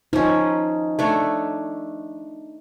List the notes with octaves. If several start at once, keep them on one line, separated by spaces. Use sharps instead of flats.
F3 C#4 D#4
A3 D4 C#5